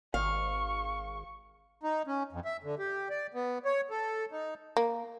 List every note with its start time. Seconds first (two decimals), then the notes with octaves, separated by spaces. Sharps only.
0.14 G#1 F5 C#6
1.83 D#4
2.07 C#4
2.32 F2
2.45 E5
2.63 D3
2.79 G4
3.10 D5
3.34 B3
3.65 C#5
3.90 A4
4.32 D#4
4.77 A#3